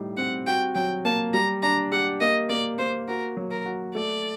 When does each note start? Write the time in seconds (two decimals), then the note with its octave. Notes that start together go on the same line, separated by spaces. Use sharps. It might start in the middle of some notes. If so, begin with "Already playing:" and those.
Already playing: A2 G3 D#4
0.17 C4 F#5
0.47 F#4 G5
0.75 F#3 G5
1.05 A#3 A5
1.34 G3 A#5
1.63 D4 A#5
1.92 G4 F#5
2.21 A#3 D#5
2.49 A#3 D5
2.78 A#3 C5
3.08 F#4 A#4
3.37 F#3
3.51 A#4
3.66 F#4
3.95 A3 D5